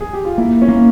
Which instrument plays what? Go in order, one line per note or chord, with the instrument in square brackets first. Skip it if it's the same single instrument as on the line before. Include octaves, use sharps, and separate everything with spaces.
[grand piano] G#4
G4
F4
[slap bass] A#3 [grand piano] E4
[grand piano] C#4
[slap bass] A#3